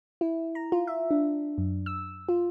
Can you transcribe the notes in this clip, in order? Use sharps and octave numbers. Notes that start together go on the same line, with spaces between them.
E4
A#5
F4
E5
D4
F#2
E6
F4